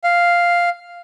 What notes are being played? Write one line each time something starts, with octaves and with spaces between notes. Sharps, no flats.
F5